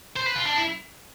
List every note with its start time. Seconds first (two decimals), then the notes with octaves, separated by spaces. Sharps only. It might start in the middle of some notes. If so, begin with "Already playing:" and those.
0.16 C5
0.27 B4
0.35 F4
0.45 D4
0.56 E4